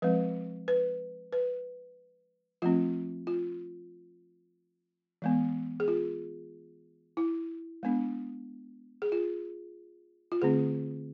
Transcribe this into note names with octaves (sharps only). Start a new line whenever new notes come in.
F3 G#3 C4 B4
B4
B4
F3 A3 C4 F4
F4
E3 G#3 B3
G#4
F4
E4
G#3 B3 D4
G#4
F4
F4
D3 A3 C4 G#4